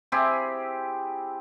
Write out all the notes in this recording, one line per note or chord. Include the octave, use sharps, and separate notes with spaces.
C4 E4 G4 G#4